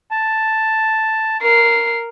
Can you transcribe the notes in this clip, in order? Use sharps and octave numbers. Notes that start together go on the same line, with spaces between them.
A5
A#4 C7